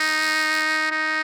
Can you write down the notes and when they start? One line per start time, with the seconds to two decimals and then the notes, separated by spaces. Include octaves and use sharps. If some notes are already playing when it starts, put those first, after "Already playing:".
Already playing: D#4
0.91 D#4